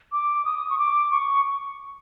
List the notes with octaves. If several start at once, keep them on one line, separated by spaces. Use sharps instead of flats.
D6
D#6
C#6
D6
C#6